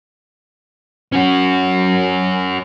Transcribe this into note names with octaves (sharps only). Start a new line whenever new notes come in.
C#4 F#4